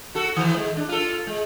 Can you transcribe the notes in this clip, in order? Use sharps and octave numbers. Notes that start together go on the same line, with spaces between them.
F#4 A4
D#3 E3
G#3
D4
F4 A4
G#3